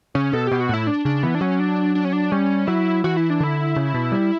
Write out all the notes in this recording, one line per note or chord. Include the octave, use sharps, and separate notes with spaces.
C#3 C#4
B2 A4
B2 G4
F#4
A2 E4
D4
C#3 D4
E3 B3
D4
F#3 C#4
D4
D4
C#4
D4
G3 C#4
F#3 E4
E3 F#4
E4
D4
D3 E4
C#3
B2
G3